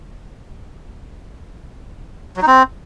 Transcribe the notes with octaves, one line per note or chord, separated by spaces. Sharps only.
F#3
D#4
C4